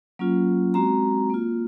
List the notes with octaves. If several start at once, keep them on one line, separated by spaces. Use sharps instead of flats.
F#3 A#3 C#4 F4
G#3 C4 F#4 A#5
A#3 F4